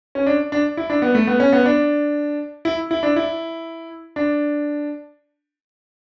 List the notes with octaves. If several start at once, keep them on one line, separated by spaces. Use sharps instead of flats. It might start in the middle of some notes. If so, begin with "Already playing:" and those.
C#4
D4
D4
E4
D4
B3
A3
B3
C#4
B3
D4
E4
E4
D4
E4
D4